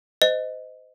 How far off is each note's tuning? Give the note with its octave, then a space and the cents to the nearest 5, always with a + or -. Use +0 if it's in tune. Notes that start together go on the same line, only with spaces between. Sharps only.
C5 -30 D#5 +0